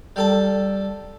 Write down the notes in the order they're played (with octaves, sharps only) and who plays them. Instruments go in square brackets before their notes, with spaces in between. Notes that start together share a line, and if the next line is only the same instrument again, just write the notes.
[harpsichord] G3 A4 A5